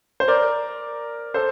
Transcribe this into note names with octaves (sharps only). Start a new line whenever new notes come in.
C5
A#4 D5
A4 C5